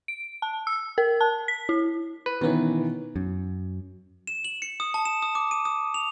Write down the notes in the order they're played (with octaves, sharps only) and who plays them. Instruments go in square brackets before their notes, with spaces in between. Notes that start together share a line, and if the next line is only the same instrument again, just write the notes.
[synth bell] D7
A5
E6
A#4
A5
B6
E4
[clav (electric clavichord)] B4
[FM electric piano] B2 B3 C#4 [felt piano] D#3 E3
[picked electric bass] F#2
[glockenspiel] E7
F#7
C#7
D#6
A5
E7
D#6
D6
D#7
D#6
F7